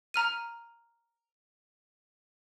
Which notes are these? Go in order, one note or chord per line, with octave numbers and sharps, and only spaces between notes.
A#5 F6 D#7